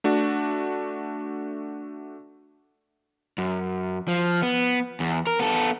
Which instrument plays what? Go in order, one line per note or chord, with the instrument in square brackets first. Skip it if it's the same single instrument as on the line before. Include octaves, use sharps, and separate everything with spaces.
[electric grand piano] A3 D4 F#4
[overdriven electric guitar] F#2
F3
B3
E2
A#4
B3 A4